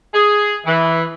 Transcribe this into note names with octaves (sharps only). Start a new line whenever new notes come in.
G#4
E3